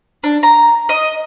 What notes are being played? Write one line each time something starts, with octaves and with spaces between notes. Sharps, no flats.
D4
A#5
D#5